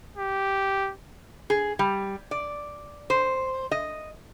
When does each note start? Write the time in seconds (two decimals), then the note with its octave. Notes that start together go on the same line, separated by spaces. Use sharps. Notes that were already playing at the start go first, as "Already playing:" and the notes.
0.17 G4
1.50 G#4
1.79 G3
2.31 D5
3.10 C5
3.71 D#5